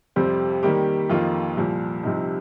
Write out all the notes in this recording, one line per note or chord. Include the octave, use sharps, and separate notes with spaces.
F2 C3 G3 C4
D#3 G3 A#3 G4
F2 D#3 A#3 F4
C2 A#2 F3
C2 C3 F3 D#4